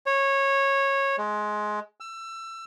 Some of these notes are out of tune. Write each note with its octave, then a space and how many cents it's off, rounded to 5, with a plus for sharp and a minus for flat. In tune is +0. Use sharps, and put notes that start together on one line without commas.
C#5 -15
G#3 +20
E6 +25